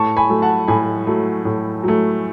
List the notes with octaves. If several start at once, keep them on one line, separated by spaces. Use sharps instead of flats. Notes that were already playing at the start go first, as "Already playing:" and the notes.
Already playing: A2 A5 C#6
G#5 B5
F#3 A3
F#5 A5
A2 G#5 B5
F#3 A3
A2
F#3 A3